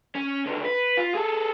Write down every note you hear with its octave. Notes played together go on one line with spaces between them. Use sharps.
C#4
C#2 D3
B4
F4
G#4 A4